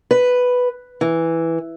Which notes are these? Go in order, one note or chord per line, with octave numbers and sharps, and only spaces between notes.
B4
E3